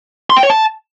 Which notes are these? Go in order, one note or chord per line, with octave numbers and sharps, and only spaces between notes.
C6
G5
C#5
A5